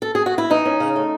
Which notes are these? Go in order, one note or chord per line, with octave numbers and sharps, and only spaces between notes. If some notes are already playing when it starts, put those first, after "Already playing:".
A4
G#4
F#4
E4
E3 D#4
C#4
C#3
A3